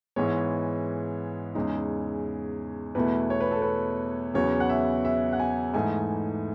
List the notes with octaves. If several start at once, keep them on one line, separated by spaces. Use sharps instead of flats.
G#2 E3 G#3 B3 C#5
E2 C#3 G#3 D#4
E2 B2 A3 E4 B4
C#5
B4
A4
B4
E2 C#3 F#3 B3 C#5
F#5
E5
E5
F#5
G#5
G#2 E3 A3 D#4 G#5